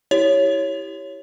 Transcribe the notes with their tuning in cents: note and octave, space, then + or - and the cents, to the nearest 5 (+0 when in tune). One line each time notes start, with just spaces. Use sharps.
E4 -10 G4 +0 C#5 +0